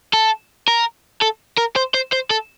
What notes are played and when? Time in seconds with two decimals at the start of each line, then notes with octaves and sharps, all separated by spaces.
0.13 A4
0.68 A#4
1.22 A4
1.58 A#4
1.76 C5
1.94 C5
2.12 C5
2.30 A4